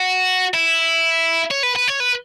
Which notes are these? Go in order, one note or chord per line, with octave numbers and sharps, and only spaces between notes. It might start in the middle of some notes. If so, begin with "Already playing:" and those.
Already playing: F#4
E4
C#5
B4
B4
C#5
B4